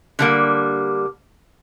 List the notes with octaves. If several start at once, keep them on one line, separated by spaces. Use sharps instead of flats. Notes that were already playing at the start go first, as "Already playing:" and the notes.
D3 G3 A#3